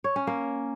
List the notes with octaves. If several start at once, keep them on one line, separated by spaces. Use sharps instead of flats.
C#5
C#4
A#3